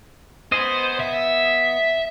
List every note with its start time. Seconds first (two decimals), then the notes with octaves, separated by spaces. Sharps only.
0.52 B3 G#4 C5 D#5
1.00 E5